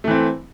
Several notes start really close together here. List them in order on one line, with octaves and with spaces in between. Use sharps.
A3 E3 C4